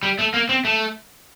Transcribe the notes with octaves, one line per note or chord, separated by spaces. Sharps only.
G3
A3
A#3
C4
A3